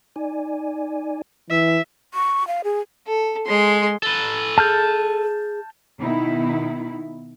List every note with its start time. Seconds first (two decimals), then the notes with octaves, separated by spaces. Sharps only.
0.16 D#4 D5 G#5
1.50 E3 E5
2.14 C#6
2.48 F5
2.64 G#4
3.07 A4
3.47 G#3 C6
4.03 A4 B4
4.58 G#4 A5 F6 G6
6.00 B2 D#3 D#4 E4